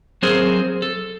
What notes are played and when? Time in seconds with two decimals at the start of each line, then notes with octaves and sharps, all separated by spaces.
0.22 F#3 C4 G#4 A#4 C5
0.82 A4